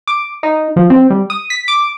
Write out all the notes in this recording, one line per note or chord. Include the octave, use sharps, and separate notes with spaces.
D6
D#4
F3
C4
G3
D#6
B6
D6